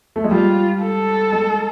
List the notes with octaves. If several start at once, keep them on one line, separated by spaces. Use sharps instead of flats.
A3
G#3
G3 F4
A4
G#3